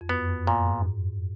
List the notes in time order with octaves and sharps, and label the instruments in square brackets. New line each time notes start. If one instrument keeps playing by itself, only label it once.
[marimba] F2
[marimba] F#2 [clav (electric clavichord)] B3
[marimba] F2
[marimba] F#2 [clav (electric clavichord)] A#2
[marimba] G#2